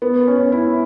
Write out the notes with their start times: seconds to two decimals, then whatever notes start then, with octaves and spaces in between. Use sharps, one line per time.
0.02 B3
0.27 C#4
0.52 E4